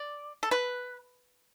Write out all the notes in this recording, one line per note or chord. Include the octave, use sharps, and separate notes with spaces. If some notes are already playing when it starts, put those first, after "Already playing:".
Already playing: D5
A4
B4